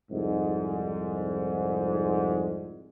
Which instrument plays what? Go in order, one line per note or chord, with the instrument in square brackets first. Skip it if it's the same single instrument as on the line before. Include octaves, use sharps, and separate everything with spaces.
[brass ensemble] C2 F2 G#2